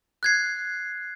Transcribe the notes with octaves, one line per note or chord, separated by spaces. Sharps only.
F#6 G#6 C7